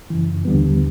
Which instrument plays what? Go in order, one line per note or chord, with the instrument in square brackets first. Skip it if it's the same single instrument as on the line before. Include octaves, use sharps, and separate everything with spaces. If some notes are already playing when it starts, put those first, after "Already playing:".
[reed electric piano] F#2 C#3 E3
D#2 D3 G3 B3